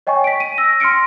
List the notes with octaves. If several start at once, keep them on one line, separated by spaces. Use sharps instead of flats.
C#5 D#5 G5 G#5 C#6
B6 D7
D#7
E6 A#6
C6 F6 A#6 C#7 D7